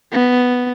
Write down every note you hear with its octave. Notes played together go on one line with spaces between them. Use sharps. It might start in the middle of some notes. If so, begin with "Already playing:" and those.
B3